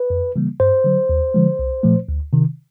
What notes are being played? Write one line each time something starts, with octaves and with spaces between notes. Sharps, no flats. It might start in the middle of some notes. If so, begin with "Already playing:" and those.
Already playing: B4
F2
C#3 E3 G3 A#3
G2 C5
D3 F#3
D#2
D3 F3 G#3
C2
A#2 F3 A3
D2
C3 D#3